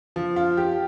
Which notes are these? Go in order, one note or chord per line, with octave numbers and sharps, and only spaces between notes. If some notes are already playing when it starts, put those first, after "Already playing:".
F3
F4
G4